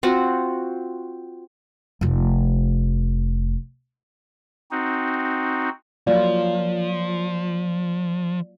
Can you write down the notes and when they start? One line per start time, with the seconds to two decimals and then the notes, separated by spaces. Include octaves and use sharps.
0.03 C4 F4 F#4
2.01 F1 F4
4.71 C4 D#4 F#4
6.07 F3 F#3 A#3 F4 D5